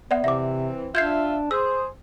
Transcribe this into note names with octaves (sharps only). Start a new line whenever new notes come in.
B3 D5 E5 F#5
C3 E3 C4 E5 D6
D4 F4 E5 G6 G#6 C7
G#4 C5 E6